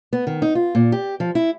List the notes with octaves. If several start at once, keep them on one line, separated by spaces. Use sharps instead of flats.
B3
D#3
D#4
F4
A#2
G4
F3
E4